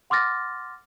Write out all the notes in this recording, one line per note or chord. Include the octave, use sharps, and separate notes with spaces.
F#5 C6 D6 F6 A6 A#6